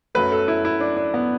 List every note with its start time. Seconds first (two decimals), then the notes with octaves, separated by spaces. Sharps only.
0.15 F#2 F#3 A3 B4
0.32 A4
0.48 E4
0.65 E4
0.80 D4
0.97 D4
1.14 B3